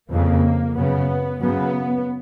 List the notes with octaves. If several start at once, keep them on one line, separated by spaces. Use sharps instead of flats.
F2 C#3 A#3
F#2 C#3 B3
F#2 C#3 B3